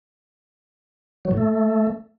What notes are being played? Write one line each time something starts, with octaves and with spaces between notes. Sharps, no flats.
F#3
A2
A3